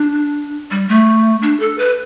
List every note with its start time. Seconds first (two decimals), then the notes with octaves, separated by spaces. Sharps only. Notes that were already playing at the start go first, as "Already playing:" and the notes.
Already playing: D4
0.71 G3
0.89 A3
1.42 D4
1.60 A4
1.78 B4